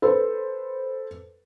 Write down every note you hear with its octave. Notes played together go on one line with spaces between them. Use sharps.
A4 B4 C5